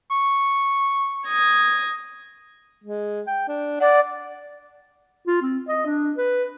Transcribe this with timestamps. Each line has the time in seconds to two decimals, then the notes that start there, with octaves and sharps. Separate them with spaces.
0.11 C#6
1.27 D#6 G#6 A#6
2.84 G#3
3.27 G5
3.48 D4
3.80 D5 F#5
5.27 F4
5.42 C4
5.68 D#5
5.86 D4
6.18 B4